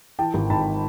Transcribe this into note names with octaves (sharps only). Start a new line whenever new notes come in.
E3 G5 A5
G#1
G#2 A5 B5